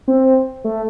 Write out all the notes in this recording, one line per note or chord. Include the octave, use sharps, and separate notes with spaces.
C4
A3